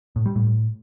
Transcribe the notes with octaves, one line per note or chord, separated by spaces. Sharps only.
A2
G3
A2